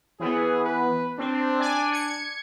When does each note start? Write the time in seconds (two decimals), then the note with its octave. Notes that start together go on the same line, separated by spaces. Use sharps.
0.20 E3 B3 G#4
0.64 B4
1.18 C4 D4
1.59 D5 G#5
1.92 G#6 C#7